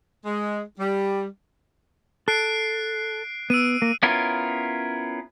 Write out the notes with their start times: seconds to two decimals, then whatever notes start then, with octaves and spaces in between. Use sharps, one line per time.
0.25 G#3
0.78 G3
2.28 A4 F#6 C7 D7
3.50 B3 E6 D7 D#7
3.82 A#3
4.03 B3 C#4 E4 F4 A#4